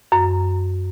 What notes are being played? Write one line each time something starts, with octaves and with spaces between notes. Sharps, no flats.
F#2